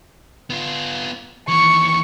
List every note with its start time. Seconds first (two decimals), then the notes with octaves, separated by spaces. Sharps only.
0.50 B3 F4
1.48 D#2 E3 C#6